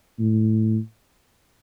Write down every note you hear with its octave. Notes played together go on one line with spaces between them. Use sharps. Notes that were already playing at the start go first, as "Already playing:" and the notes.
A2